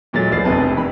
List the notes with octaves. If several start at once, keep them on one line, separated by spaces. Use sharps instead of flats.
E2 A#2 F#3 G#3 A3 A6
D#1 A1 A6 C7
F1 A#1 B2 C4 B4 A5
F2 D#3 B5